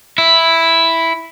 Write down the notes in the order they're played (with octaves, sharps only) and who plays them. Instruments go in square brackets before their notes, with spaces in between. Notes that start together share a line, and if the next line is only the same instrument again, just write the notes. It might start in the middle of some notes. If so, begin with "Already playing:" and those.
[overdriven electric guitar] E4